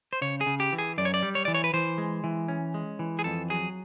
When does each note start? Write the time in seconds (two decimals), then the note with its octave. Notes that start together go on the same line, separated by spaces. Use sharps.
0.13 C5
0.21 C#3 C#5
0.41 G#4
0.46 C#3
0.60 G4
0.73 E3
0.78 G#4
0.98 F#2 D5
1.05 C#5
1.14 D5
1.23 G3
1.35 C#5
1.45 E3 D5
1.54 C#5
1.64 B4
1.73 E3 C5
1.98 G#3
2.24 E3
2.48 C#4
2.74 G#3
2.99 E3
3.19 G#4
3.24 F2 A4
3.50 F#3 G#4